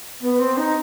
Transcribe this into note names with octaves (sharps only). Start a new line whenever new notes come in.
B3
C4
D#4